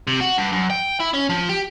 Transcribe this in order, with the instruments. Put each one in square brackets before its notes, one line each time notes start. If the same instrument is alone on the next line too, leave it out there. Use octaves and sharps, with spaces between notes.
[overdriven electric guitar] C3
F#4
G2
F#2
G5
E4
C#4
F3
G4